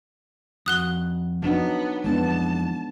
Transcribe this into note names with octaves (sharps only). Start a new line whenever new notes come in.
F2 F#4 D#6 F#6 G7
F#3 B3 D4 D#4
F2 E3 G#3 B3 D4 A5